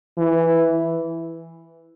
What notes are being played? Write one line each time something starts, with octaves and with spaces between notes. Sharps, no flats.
E3